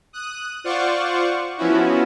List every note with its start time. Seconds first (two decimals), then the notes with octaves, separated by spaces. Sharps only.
0.13 D#6 F#6
0.64 F4 C5 D5 F#5 C#6
1.57 F3 B3 C#4 E4 F#4